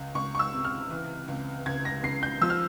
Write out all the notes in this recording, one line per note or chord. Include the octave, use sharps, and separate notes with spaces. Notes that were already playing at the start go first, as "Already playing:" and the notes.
Already playing: C#2
C#2 C#6
C#6
E6
C3
F6
E3
C#2
C#2 G#6
A#6
C#3 C7
G6
F3 E6
F6